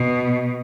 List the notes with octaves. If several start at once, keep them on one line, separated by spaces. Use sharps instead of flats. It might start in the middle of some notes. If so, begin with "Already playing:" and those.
Already playing: B2